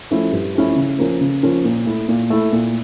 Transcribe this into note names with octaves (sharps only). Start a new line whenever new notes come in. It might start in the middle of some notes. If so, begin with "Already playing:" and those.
F3 A3 C#4 E4
G2
F3 A3 C#4 E4
C#3
F3 A#3 C#4
C#3
F3 A#3 C#4
A#2
A3 E4
A#2
A3 E4
A#2